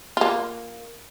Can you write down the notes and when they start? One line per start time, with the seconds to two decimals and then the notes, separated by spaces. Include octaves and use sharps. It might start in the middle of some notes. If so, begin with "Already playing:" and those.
0.17 A#3 F4